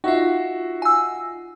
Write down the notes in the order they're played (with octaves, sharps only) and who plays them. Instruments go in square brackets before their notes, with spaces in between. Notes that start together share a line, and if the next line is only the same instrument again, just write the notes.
[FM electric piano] D#4 F4 [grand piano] F#4 E5
[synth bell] G#5 E6